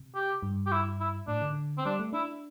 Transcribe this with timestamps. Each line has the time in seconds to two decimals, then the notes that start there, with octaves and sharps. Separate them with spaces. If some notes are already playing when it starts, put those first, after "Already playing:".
Already playing: C3
0.15 G4
0.43 G2
0.66 G4
0.72 E4
1.00 E4
1.27 A2 D4
1.42 D3
1.78 C4
1.85 G3 D4
1.99 A3
2.13 D4 E4